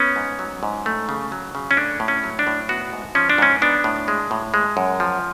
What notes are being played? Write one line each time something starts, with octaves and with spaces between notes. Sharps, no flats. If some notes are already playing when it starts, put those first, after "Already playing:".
Already playing: B3 C#4
G#2
F#3
G#2
A3
C#3
F#3
C#3
C#4
A3 D4
A2
C#4
F#3
D4
A2
B3 F#4
G#2
F3 C#4
D4
G#2 C#4
B3 D4
A2
G#3
A2
G#3
F#2
F3